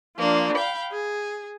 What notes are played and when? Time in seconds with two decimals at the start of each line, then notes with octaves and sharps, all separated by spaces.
0.18 F3 A#3 D4
0.55 F5 G5 B5
0.91 G#4